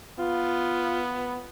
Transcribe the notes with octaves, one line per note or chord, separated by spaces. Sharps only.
B3 F4